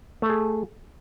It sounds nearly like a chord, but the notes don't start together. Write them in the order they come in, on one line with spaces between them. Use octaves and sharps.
A3 A4 G#4